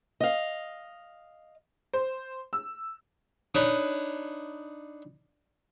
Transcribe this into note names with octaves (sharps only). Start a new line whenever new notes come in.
D#5 F5
C5
E6
D4 D#4 B4 C#5